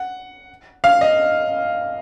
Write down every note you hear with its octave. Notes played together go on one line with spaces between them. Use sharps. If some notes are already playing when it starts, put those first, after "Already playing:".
Already playing: F#5
F5
D#5